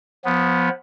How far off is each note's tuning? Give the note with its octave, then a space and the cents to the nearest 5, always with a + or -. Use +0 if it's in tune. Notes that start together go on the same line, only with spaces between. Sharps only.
F3 +20 B3 +0